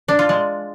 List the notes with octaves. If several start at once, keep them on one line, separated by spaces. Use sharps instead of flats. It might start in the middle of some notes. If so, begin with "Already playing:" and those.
D4
F4
G#3